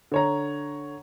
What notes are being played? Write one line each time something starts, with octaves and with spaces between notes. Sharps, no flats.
D3 C#5 A#5